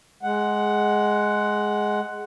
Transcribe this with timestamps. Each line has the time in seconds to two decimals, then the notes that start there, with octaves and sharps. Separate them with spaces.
0.23 G#3 F#5